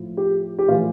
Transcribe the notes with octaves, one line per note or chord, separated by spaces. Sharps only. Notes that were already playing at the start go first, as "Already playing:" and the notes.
Already playing: A2 F3
G4
G4
A2 E3 F4